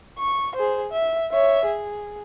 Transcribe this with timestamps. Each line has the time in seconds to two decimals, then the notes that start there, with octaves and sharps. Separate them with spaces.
0.19 C#6
0.55 G#4 C5
0.92 E5
1.32 C#5 E5
1.66 G#4